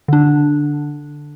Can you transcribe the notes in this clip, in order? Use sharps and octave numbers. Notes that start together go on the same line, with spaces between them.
D3 D4